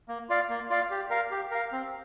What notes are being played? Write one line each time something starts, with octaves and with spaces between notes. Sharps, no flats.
A#3
F4 D5 F5
A#3
F4 D5 F5
G4
A#4 F5
G4
A#4 F5
C4